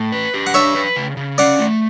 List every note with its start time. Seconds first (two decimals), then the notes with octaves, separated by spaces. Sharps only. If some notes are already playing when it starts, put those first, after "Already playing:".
Already playing: A2
0.12 B4
0.34 G4
0.47 F#5
0.54 D4 C#5 E5
0.75 B4
0.96 C#3
1.17 C#3
1.38 C#4 D5 F#5
1.59 A3